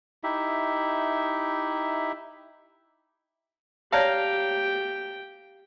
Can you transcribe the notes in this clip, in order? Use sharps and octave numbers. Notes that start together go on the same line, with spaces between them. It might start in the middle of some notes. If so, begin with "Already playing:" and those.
D#4 E4 G4 E5
G4 C#5 D5 F5 G5 A5 A#5